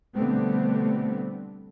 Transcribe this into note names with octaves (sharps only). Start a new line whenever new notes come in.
B2 D3 G3 A3 B3 C4